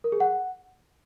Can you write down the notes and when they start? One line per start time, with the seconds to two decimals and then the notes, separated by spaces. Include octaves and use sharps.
0.04 A#4
0.12 G#4
0.20 F#5